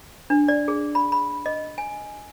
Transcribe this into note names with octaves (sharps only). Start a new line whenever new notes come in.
D4
D5
G#4
B5
B5
D#5
G#5